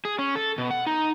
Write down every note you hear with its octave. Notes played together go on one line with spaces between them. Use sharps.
G#4
C#4
A4
B2
F#5
D#4